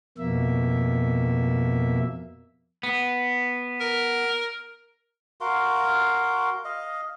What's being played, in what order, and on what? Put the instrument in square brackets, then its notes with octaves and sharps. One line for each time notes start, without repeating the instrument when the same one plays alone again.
[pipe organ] F2 B2 A#3 E5
[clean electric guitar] B3
[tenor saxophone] A#4
[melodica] F#4 A#4 F5 C6
D#5 F5